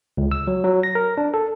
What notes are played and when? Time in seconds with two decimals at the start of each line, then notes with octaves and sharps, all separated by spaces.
0.17 C#2
0.31 E6
0.47 F#3
0.64 F#3
0.83 A#6
0.95 A#4
1.17 D4
1.34 A4